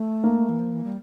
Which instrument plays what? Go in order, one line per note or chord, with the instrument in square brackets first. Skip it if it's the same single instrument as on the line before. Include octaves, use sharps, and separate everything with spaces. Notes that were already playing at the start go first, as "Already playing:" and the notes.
Already playing: [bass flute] A3
[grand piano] A#3
[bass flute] E3
F3
E3
G3